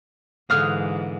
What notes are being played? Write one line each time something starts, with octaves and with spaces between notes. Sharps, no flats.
G#2 D3 E3 F5 D#6 F6 F#6